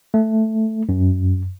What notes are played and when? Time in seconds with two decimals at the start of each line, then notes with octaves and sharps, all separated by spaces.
0.14 A3
0.89 F#2